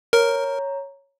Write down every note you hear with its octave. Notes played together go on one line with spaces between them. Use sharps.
A#4 C#5 A#5